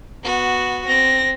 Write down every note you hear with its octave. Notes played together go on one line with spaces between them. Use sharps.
B3 F#4
C4 A#6